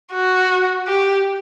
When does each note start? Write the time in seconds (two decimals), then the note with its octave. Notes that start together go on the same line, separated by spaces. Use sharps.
0.12 F#4
0.88 G4